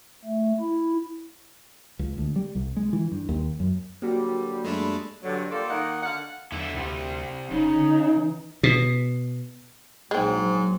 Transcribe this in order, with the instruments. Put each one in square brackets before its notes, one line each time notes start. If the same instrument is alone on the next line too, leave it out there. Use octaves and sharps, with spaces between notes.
[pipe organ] A3
E4
[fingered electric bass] C#2
D2
G3
C2
G#3
E3
G2
D#2
F#2
[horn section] D3 F#3 G3 [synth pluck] A#3 F#4 G4
[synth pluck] F#2 B5 [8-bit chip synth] G#3 A3 D4
[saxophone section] G2 D3 F#3
G3 A#3 F4 A4 D5
D#3 A#3 D#4 F#5
D3 F5 F#5
[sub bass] E2 [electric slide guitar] D3 E4
[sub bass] D2 [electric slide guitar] C3 G3
[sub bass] F1 [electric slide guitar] C#3 [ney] D#4
[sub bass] D3
E3
[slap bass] B2
[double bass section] A#1 F#3 [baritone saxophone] G#2 [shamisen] G#3 C4